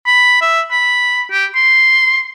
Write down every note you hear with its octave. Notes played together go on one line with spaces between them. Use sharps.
B5
E5
B5
G4
C6